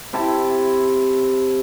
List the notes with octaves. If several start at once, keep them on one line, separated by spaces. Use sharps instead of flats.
C3 E4 A5